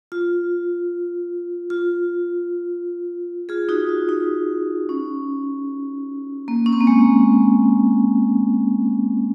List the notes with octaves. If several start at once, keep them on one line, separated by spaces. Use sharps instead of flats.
F4
F4
F4 G#4
D#4 F#4
F4
D#4
C#4
A#3
C#4
C4
A#3
G#3